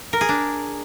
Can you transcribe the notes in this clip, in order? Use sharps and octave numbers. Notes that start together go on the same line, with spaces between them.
A#4
G#4
D4